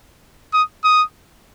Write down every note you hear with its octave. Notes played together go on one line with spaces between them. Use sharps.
D#6
D#6